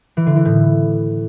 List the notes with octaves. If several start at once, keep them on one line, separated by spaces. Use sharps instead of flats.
E3
D3
E3
A2